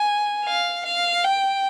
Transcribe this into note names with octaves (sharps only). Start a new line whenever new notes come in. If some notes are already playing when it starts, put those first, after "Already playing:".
Already playing: G#5
F5
F5
G5